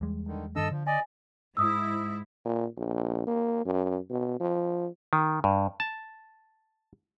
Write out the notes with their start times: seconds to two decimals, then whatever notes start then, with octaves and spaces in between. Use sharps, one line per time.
0.01 E2 G3 G#3
0.27 D3 D#3
0.56 G2 D#3 D4 A4 D#5 E6
0.71 D3 F3
0.87 D5 D#5 G#5
1.57 G#2 E4 D#6 E6
2.45 A#2
2.77 A#1
3.27 A#3
3.66 F#2
4.10 B2
4.40 F3
5.13 D#3
5.44 G2
5.80 A5